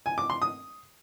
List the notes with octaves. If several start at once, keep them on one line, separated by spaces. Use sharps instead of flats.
G#5
D6
C6
D#6